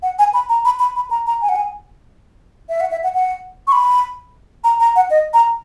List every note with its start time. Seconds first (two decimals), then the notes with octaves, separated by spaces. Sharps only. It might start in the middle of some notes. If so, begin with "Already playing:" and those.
0.03 F#5
0.19 G#5
0.34 B5
0.49 A#5
0.65 B5
0.79 B5
0.96 B5
1.11 A#5
1.26 A#5
1.42 G#5
1.49 F#5
1.56 G#5
2.69 E5
2.80 F#5
2.91 E5
3.03 F#5
3.15 F#5
3.67 C#6
3.72 B5
4.64 A#5
4.80 A#5
4.96 F#5
5.10 D#5
5.34 A#5